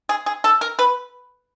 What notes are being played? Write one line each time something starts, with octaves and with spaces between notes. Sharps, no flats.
G#4
G#4
A4
A#4
B4